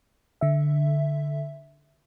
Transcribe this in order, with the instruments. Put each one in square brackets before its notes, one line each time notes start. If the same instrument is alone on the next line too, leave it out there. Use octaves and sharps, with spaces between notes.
[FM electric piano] D3 E5